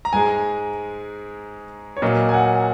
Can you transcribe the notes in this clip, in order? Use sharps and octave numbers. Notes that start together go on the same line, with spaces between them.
A#5
G#2 G#3 G#5
C#5
A#2 F#3 A#3 D#5
G#5
F#5